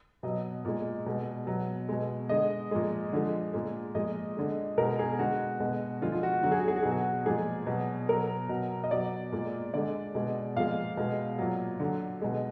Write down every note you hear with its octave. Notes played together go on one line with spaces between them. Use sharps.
B2 F#3 D#5
A#2 G#3
B2 G#3
B2 F#3
B2 G#3
D3 G#3 D#5
A#2 F3 G#3
D3 F3 G#3
A#2 G#3
A#2 F3 G#3 D#5
D3 G#3
B2 G#3 A#4
G#4
D3 G#3 F#4
B2 G#3
D3 F3 G#3 F4
F4
F#4
D3 F#3 F#4
G#4
F#4
G#4
F#4
B2 F#3 G#4
F#4
A#2 F3 G#3 G#4
B2 F#3
B2 F#3 A#4
B2 F#3
D#5
B2 F#3 D5
A#2 G#3
D3 G#3 D5
B2 G#3
A#2 F3 G#3 F5
B2 G#3
A#2 F#3
D3 F#3
B2 G#3